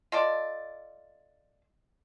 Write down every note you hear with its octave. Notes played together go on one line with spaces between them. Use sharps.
F4 A4 D5 D#5